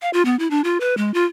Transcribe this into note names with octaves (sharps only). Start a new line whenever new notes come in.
F5
F4
B3
E4
D4
F4
B4
G#3
F4